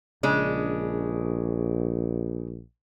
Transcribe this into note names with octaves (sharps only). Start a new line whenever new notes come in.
A#1 C#3 G#3 D4